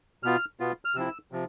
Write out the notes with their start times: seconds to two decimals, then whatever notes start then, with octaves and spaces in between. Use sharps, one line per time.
0.23 B2 B3 F4 F6
0.60 B2 B3 F4
0.85 F6
0.95 C3 F3 C4 E4 E6
1.32 C3 F3